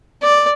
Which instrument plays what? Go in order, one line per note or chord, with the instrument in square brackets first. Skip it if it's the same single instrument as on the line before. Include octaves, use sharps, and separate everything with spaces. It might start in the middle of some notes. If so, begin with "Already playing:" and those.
[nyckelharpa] D5